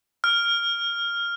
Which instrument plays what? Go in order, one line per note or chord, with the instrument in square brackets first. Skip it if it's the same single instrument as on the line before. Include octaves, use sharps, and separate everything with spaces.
[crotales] F6